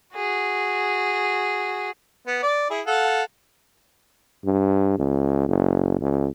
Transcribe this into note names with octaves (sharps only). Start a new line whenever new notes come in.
F#4 G#4
B3
D5
E4 G#4
A4 F5 F#5
G2
C#2
F#1
C#2